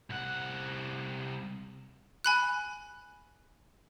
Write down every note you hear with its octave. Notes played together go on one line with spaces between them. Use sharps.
C2 F#5
G#5 B5 F#6